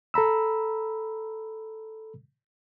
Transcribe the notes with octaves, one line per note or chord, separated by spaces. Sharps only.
A4 A#5 B5 E6